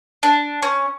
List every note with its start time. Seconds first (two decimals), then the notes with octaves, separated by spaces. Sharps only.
0.23 D4
0.63 C#4